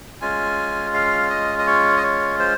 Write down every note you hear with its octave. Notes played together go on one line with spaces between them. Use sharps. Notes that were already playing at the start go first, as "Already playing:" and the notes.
G#3 C#4 F4 G#5
F5
D#5
D#5
C#5
D#5
C#5
C5